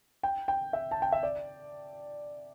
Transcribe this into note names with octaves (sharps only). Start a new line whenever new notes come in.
G5
G5
E5
A5
G5
E5
D5